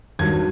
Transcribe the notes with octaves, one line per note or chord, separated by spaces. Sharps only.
G#1 G2 D#3 F#3 G#6